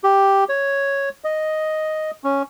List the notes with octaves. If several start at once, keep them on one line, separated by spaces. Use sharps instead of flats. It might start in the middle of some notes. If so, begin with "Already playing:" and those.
G4
C#5
D#5
C#4